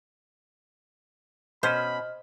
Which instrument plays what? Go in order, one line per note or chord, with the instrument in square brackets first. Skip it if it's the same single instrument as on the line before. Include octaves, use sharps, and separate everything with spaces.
[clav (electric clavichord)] B2 C#4 B4 [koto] C5 [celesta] D#5 F6 [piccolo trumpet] B5